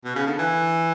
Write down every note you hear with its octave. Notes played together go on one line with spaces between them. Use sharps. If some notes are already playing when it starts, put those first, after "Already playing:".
B2
C#3
D3
E3